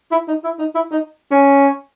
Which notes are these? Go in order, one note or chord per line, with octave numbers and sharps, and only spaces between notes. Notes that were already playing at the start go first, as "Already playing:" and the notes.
E4
D#4
E4
D#4
E4
D#4
C#4